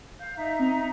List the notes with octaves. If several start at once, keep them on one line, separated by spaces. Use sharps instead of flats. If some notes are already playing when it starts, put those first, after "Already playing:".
F5 G6
D#4 E5 A#5
C4